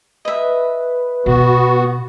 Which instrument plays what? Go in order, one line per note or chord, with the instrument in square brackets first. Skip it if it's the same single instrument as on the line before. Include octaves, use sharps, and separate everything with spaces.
[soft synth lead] B4 [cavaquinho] D#5 E5
[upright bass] B2 [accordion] B3 F#4